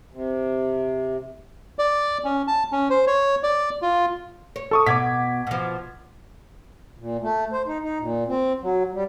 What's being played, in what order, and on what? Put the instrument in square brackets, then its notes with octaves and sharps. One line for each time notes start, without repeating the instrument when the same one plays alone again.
[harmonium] C3
[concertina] D5
C#4
A5
C#4
C5
C#5
D5
F4
[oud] C#5
[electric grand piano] A4 C#6 D#6
[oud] B2 [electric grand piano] D6 G#6 B6
[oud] B2 F3
[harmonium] A#2
A3
C5
D#4
D#4
A#2
C4
F#3
G3